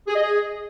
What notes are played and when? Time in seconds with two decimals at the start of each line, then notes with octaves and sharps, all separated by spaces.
0.08 G#4
0.15 D#5
0.22 G#4